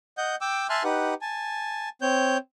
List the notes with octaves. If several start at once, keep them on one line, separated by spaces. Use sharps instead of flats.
D#5 F#5 G6
G5 D6 E6
E5 G#5 A5 C6 F6 F#6
D#4 G4 B4 F#5
G#5 A5
C4 C#5 G6